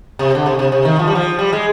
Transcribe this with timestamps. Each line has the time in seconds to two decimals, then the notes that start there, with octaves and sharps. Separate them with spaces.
0.19 C3
0.35 D3
0.46 C3
0.59 C3
0.72 C3
0.85 D#3
0.99 F3
1.07 G3
1.15 F3
1.39 G3
1.53 G#3